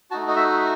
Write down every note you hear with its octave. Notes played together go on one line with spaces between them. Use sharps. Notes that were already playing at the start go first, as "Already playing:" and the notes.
A3 D#4 F#4 A5
D#5
E5